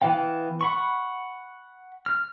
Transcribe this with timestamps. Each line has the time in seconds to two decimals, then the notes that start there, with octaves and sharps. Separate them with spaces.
0.02 E3 B3 F5 G5
0.61 F#5 B5 C#6
2.06 F6